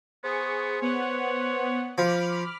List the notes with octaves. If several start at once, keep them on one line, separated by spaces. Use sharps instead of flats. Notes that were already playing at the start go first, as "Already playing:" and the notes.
B3 G#4 C5 C#6
B3 C#5 F#5
F3 B5 D6 F6